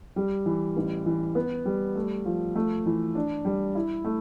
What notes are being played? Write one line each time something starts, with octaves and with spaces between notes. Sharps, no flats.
G3
E3
A1
E3
B3
G3
A3
F3
A3
E3
D4
G3
E4
A3